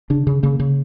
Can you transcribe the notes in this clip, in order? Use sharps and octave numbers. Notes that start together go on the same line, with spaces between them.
C#3 D4
C#3
C#3 A#3
C#3